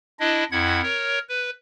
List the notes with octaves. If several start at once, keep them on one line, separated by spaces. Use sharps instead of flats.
D4 E4 D#5
F2 E4 F#5 G#6
A#4 C#5
B4